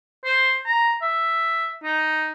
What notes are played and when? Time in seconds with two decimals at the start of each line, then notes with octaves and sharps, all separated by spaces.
0.25 C5
0.65 A#5
1.02 E5
1.83 D#4